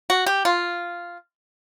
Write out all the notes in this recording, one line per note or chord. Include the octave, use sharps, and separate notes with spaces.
F#4
G4
F4